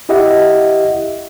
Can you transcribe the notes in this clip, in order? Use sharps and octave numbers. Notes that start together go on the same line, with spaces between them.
E4 G4 D#5 E5 F#5